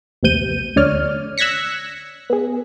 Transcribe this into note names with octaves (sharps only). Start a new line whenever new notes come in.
A#1 D#2 C3 G6 D#7
D2 D3 C#5 D5 F6
E6 F#6 G#6 A#6 B6 C#7
B3 G#4